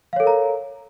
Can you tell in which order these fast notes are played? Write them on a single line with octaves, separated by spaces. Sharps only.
F5 C#5 A4 A#4 A#5